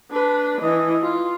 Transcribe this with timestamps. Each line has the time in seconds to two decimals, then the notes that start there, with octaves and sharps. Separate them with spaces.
0.11 D4 B4
0.61 E3 D#5
1.02 F4